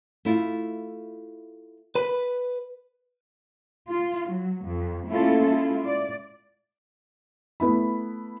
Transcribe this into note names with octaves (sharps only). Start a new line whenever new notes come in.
A3 E4 F4
B4 B5
F4
F#3
F2
A3 A#3 C#4 E4 F4 A4
G#3 E4 F4
D5
A3 B3 E4 B5